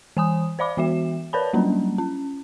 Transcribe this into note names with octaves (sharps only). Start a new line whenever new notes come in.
E3 G#5 D#6
C5 D5 F5 B5 D6
E3 B3 F#4 E5 E7
A#4 B4 C#5 D5 A5 B5
F#3 G3 A#3 C#4 D4
C#4